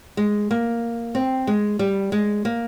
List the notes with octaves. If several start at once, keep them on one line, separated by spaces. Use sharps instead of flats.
G#3
A#3
C4
G#3
G3
G#3
A#3